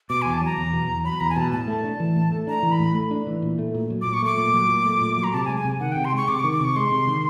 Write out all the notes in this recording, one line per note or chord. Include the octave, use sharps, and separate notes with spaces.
B2 D6
E2 G#5
A5
F#3 A#5
E2
B2
E2
F#3 B5
E2 A#5
G#5
B2 A5
A2 A5
A3
D4
E3
A2
A3
D4 A#5
E3
B5
A2
A3
D4
E3
A#2
A3
A#2
F#3
A#2 D6
C#6
A3 D6
A#2
F#3
A#2
A3
A#2
F#3
A#5
C3 A5
G#5
G#3
G#5
C3
D#3 F#5
C3 G5
C6
G#3 C#6
C3 D6
D#3 C#6
D6
C3 C#6
G#3 C6
C3
D#3